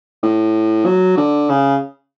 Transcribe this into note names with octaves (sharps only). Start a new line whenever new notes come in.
A2
F#3
D3
C#3